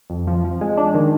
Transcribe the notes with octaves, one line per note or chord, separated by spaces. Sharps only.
F2
F3
F3
G#3
D4
D#3